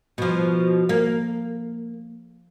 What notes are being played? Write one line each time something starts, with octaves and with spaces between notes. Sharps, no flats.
B2 F3
A#3